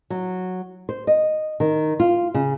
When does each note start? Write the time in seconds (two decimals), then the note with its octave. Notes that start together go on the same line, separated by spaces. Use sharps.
0.10 F#3
0.89 C5
1.07 D#5
1.60 D#3
2.00 F4
2.34 C#3